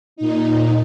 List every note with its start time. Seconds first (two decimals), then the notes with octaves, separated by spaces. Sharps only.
0.16 A#2 D#4